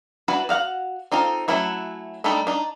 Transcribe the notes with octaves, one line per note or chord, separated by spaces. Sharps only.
D4 E4 F#4 B4
F#4 F5 F#5
C4 D#4 F4 A4
F#3 A3 C#4 E4 F#4
G3 A3 D4 D#4 A4
D4 D#4